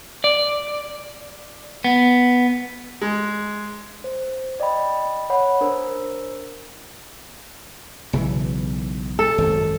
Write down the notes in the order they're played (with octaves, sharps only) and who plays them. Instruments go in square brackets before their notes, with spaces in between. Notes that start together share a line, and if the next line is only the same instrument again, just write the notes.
[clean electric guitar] D5
B3
[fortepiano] G#3
[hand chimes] C5
D5 D#5 G5 B5
C#5 F#5 B5
D4 A#4 C5
[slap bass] B1 C#3 E3
[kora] A4
[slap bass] G#1 F#2